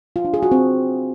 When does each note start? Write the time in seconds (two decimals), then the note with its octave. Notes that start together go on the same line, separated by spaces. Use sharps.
0.16 F4
0.25 D4
0.34 G#4
0.43 F#4
0.52 C4